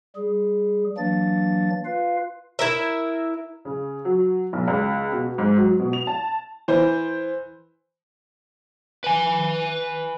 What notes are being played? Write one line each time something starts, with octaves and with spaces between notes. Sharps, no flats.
G3 G#4
E3 F#3 A#3 D4 A6
F4 B4 F5
E4 A#4 E5
C#3
F#3
B1
C#2
B2
G#2
F#3
B2
F7
A5
E3 C5
B4 G#5